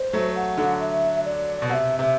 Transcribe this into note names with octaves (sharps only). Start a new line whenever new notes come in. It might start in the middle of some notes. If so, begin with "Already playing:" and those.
Already playing: C5
F#3 A3
F#5
D3 F#3
E5
D5
B2
C3 E5 F#5
C3 E5